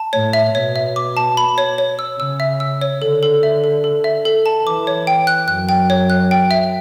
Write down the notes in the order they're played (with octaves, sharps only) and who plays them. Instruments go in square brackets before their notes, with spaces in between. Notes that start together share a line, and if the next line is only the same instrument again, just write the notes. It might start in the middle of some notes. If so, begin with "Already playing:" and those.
Already playing: [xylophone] A5
[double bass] A2 [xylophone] C#5
[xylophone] E5
[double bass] B2 [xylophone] C#5
[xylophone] E5
D6
A5
B5
C#5
C#5
E6
[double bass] C#3 [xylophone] E6
[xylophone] E5
E6
C#5
[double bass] D3 [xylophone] A4
[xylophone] A4
E5
A4
A4
E5
A4
A5
[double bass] E3 [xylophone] D6
[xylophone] C#5
G5
F#6
[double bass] F#2 [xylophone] F#6
[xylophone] G5
C#5
F#6
G5
E5